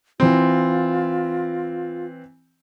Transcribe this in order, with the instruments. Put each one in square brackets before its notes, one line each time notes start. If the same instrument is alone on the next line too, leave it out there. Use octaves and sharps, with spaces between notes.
[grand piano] E3 C4 [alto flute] F4